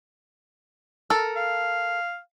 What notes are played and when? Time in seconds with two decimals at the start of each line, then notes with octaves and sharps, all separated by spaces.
1.10 A4 A#4
1.36 F5